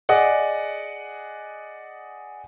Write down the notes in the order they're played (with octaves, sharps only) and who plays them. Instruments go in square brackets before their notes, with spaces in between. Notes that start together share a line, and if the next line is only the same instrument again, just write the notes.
[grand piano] G#4 D5 D#5 F#5